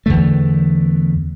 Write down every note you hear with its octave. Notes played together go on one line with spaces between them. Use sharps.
E2 D3 A3